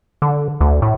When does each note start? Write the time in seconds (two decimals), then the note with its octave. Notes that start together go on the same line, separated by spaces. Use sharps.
0.22 D3
0.61 D2
0.82 A2